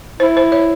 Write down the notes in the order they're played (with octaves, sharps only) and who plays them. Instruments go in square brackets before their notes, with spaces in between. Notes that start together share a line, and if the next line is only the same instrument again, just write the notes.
[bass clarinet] E4 [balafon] C5
[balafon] C5
C#5